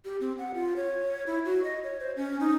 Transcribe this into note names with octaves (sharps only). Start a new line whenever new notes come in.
G4
C4
F#5
F4
C#5
E4
F#4
D#5
C#5
C5
C#4
D#4